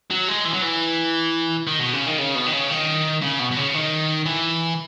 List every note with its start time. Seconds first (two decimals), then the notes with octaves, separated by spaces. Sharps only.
0.11 F#3
0.28 G#3
0.45 E3
0.54 F#3
0.62 E3
1.67 D#3
1.79 B2
1.93 C#3
2.06 D#3
2.18 C#3
2.35 B2
2.46 D#3
2.53 C#3
2.70 D#3
3.22 C#3
3.39 B2
3.51 B2
3.57 C#3
3.74 D#3
4.26 E3